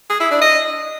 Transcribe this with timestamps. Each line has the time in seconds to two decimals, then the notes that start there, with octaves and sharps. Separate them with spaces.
0.10 G#4
0.20 E4
0.31 D4
0.41 D#5